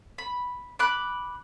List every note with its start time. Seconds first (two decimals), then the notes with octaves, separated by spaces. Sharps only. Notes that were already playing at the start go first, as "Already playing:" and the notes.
0.18 B5
0.79 B5 D6 F#6